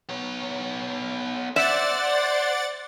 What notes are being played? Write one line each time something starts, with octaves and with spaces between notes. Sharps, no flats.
B3 C#5
C5 D5 E5 F#5 A6